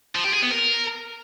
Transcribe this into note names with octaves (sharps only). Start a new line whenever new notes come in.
F3
G4
G#4
B3
A#4